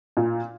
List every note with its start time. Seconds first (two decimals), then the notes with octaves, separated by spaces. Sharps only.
0.17 A#2